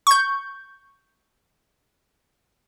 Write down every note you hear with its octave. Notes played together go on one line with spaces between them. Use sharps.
C#6 G6